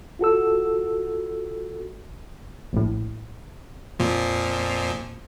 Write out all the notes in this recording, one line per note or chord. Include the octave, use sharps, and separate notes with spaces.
F4 F#4 A4 E6
A#1 A2
F2 A#2 F3